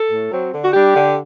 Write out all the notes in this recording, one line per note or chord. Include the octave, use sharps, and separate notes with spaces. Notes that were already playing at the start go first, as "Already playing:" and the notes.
Already playing: A4
A2
F#3 C4
D3
F#4
G3 D4 G4
D3